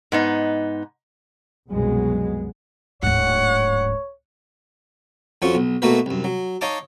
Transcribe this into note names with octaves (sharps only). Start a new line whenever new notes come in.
G#2 B3 D#4
C2 F#2 B2 F#3 G#3 B3
D1 G#2 C#5 F#5
F2 F3 C#4 F4 F#4 C#6
B1
B2 A3 A#3 F#4 A#4 B4
C2 F#2
F#3
D#4 C#5 D#5 F5 A5 D6